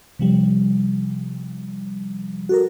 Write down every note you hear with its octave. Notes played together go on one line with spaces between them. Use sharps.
C3 F3 G3
F#4 A4 A#4